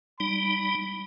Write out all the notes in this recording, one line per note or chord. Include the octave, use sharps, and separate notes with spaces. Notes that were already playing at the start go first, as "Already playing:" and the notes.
G3 D#4 B5